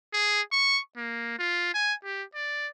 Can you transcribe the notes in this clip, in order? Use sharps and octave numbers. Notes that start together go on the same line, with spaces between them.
G#4
C#6
A#3
F4
G#5
G4
D5